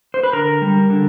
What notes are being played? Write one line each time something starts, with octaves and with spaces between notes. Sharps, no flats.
C5
B4
D3 A#4
G3
D3